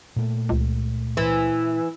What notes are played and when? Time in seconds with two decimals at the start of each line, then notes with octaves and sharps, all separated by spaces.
0.16 A#2 A3
0.49 C#2
1.17 E3